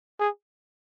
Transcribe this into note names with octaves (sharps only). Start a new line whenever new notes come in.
G#4